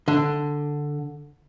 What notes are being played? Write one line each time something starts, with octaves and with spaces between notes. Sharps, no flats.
D3